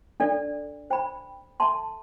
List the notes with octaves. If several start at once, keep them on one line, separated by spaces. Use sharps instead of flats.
D4 A4 D5
C5 G5 B5
A4 E5 A5 C6